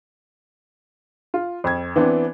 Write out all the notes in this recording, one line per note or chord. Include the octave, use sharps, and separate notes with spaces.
F4
F2 G#6
E3 B3 C4 D4